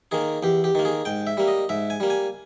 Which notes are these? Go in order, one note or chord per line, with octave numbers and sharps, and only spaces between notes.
D#3 A#3 G#4
E2 G4
G4
D#3 A#3
G#4
G#2 G5
E5
G3 A#3
D#5
G#2 E5
G#5
G3 A#3
G#5